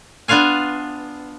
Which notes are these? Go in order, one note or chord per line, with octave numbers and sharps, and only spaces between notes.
B3 D4 F4 F5 G#5